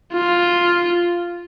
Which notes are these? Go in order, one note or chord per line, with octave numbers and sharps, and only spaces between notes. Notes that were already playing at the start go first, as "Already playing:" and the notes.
F4